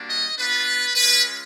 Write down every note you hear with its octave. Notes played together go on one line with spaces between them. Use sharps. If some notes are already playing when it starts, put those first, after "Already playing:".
Already playing: G3 A#3 D4 F#4
D#5
B3 D4 F4 B4
G#3 C#4 F4 B4